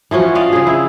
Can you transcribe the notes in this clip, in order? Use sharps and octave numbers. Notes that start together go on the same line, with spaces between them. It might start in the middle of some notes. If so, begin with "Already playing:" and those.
E3 F3 C#4 F#4
F4 D5 D#5 F5
C#3 G#4
E4